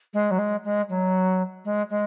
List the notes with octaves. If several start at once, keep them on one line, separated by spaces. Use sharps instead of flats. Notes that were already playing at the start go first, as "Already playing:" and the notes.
G#3
F#3
G#3
G#3
F#3
G#3
G#3